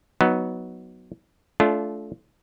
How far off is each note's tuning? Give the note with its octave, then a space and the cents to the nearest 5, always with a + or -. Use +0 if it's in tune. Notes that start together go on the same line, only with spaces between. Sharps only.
F#3 +0 B3 +0 D#4 +20
A3 -20 D4 -40 F4 -5